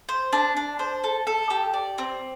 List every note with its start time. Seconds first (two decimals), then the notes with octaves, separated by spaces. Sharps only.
0.09 C5
0.33 D4
0.57 D4
0.79 C5
1.04 A4
1.27 A4
1.50 G4
1.74 D5
1.98 C4